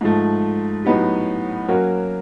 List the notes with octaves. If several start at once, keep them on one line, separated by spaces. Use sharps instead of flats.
G#2 F3 A3
A2 F#3 B3 D#4 G4
F#3 A#3 C#4 F#4 A#4